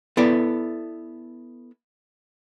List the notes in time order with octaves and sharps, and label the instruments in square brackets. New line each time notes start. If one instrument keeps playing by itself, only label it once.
[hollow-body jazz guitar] B3 E4 A4 D5